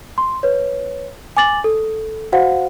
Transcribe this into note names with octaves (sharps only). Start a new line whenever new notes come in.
C6
B4 C#5
G#5 D6 A6 F#7
A4
F#4 C5 F5 F#5